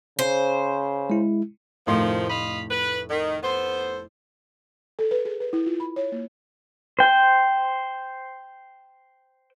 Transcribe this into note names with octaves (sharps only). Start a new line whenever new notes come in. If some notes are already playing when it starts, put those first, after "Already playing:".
C#3 C5
G#3 E4
F1 A2 D#3 F3 C6
D#5 F5 B5
B4
D#3
B3 A4 C5
A4
B4
G#4
B4
E4
F4
B5
C#5
A#3
C5 G5